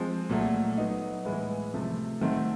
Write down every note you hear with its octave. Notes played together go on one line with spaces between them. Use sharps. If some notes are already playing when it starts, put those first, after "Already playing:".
Already playing: F3 G#3 C4
A#2 F#3 A3
F#3 B3 D#4
A2 E3 G#3 B3 E4
C3 F3 A3
D#3 F#3 A3 C4